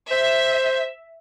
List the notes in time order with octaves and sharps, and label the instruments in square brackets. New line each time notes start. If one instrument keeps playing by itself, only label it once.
[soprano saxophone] C5 [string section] E5